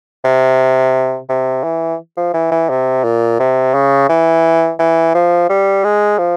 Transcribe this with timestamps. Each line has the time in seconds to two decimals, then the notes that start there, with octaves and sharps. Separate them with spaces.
0.24 C3
1.29 C3
1.63 E3
2.17 F3
2.33 E3
2.52 E3
2.69 C3
3.04 A#2
3.39 C3
3.74 C#3
4.09 E3
4.79 E3
5.14 F3
5.49 G3
5.84 G#3
6.18 F3